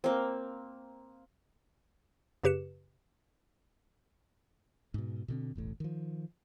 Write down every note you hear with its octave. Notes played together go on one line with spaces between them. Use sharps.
A#3 C4
F#2 C#3 G4 B4 C#7 E7
G#2 B2
B2 D3 C4
E1 A1 A2
D#3 F3